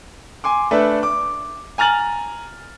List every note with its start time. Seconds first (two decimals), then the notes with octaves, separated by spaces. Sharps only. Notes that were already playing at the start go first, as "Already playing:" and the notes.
0.44 G#5 C6 D6
0.71 A3 D4 A4 B4 E5
1.03 D6
1.78 G#5 A#5 F6 A6 F#7